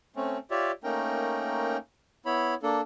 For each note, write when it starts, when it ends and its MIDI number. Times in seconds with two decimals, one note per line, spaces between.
0.16 0.38 57
0.16 0.38 60
0.16 0.38 61
0.51 0.71 65
0.51 0.71 67
0.51 0.71 73
0.51 0.71 74
0.51 0.71 76
0.84 1.77 57
0.84 1.77 58
0.84 1.77 61
0.84 1.77 63
0.84 1.77 70
0.84 1.77 79
2.26 2.54 59
2.26 2.54 64
2.26 2.54 73
2.26 2.54 83
2.63 2.81 58
2.63 2.81 62
2.63 2.81 69